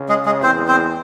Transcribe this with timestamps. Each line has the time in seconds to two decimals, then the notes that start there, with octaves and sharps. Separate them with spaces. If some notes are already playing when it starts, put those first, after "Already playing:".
Already playing: C#3
0.09 G#3 G#4
0.26 G#3 G#4
0.43 E2 C4 C5
0.68 C4 C5